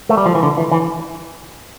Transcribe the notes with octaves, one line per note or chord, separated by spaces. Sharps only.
A3
G3
F3
E3
D3
E3
E3